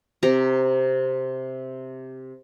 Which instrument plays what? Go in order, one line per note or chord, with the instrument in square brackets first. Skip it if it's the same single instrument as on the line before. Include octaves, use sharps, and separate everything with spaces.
[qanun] C3 G4 A#5